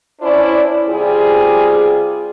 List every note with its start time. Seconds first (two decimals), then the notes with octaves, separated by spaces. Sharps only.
0.21 C#4 D4 E4 C5 D5
0.88 C3 G3 F4 G#4